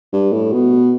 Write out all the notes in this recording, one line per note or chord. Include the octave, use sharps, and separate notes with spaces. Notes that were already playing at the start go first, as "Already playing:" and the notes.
G2
A2
B2